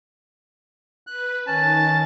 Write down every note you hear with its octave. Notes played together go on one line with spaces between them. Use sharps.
B4 F#6
D#3 C#4 A5 A6